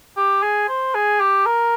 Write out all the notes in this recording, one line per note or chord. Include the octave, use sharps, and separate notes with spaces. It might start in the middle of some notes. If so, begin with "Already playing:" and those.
G4
G#4
C5
G#4
G4
A#4